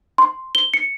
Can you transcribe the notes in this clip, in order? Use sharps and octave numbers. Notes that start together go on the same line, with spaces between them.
C6
G7
C#7